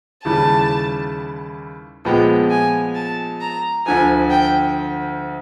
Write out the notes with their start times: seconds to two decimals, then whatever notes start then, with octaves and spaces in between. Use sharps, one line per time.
0.25 D#2 C#3 E3 G3 A5
2.05 A#2 F3 G#3 B3 G5
2.50 G#5
2.95 A5
3.41 A#5
3.86 D2 D3 F3 G#5
4.31 G5